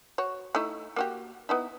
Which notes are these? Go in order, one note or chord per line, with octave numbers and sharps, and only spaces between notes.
F#4 C#5
A3 D#4 E4
A#3 F#4 G4
B3 D#4 E4